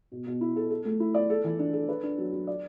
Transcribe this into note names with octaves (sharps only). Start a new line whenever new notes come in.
B2
B2
E4
A4
A4
A3
E4
D5
A4
E3
D4
A4
B4
D4
F#3
F#3
D5